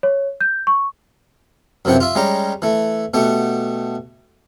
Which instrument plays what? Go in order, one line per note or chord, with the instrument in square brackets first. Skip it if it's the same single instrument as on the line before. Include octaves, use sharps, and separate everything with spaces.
[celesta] C#5
G6
C#6
[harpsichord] F#2 C3 E3 F3 F#5 G5
F4 E5
G3 G#3 C#4 G4 A#5
E3 A3
B2 A3 G4 F#5